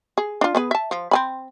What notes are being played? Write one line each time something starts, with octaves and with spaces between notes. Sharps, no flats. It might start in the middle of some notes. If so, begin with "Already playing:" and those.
G#4
D4 F4
B3 G#4 B4
E5 A5
F3
C4 G#5 B5